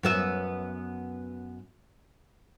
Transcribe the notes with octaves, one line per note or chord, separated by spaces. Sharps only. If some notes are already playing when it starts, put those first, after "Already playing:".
F#2 B3 E5